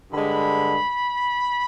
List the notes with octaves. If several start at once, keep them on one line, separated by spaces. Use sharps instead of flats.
G2 D3 G#3 B5